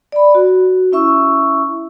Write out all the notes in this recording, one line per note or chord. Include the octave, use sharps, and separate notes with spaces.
D5 B5
F#4
C#4 E4 E5 C#6 E6